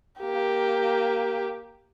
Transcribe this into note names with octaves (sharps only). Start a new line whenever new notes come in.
A#3 G4